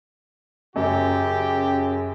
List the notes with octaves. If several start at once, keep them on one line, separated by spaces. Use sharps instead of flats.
F#2 C#3 G4